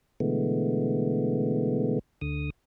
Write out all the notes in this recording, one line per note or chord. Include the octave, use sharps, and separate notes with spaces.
B2 D3 E3 G#3 A3 B3
D2 D3 D#6